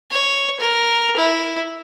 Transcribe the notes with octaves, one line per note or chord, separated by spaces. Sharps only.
C#5
A#4
E4